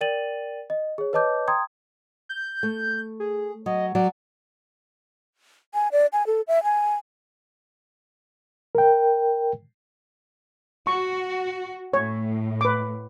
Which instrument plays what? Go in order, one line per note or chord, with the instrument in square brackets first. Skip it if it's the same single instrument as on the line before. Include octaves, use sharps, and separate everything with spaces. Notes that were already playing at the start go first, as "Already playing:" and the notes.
[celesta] A#4 D5 G5 A6 D#7 F#7
D#5
G#4 C#5
B4 C#5 D#5 A5 D6 G6
G5 A#5 C6 D#6 G#6
[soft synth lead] G6
[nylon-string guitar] A3
[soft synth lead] G#4
[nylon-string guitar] F#3 [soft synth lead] D#5
[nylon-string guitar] F#3 [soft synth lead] D5
[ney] G#5
D5
G#5
A4
E5
G#5
[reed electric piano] A#4 G5
[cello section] F#4 [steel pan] C#6
[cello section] A2 [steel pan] C#5
[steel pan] B4 D6